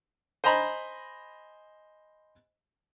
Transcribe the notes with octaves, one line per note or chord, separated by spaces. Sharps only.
C5 D#5 G#5 A#5 B5